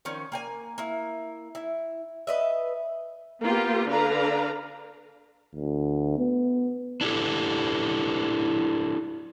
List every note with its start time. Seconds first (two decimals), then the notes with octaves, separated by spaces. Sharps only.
0.05 D#3 F3 C#4
0.32 A#3 G5 G#5
0.78 A#3 E4
1.55 E4
2.27 B4 D#5 E5
3.42 A#3 B3 F4 G4
3.88 D3 D4 B4 F5 A#5
5.55 D2
6.18 B3
7.01 D4 E4 G4 A4